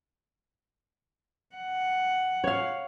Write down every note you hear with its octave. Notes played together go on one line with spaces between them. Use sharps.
F#5
C#5 F5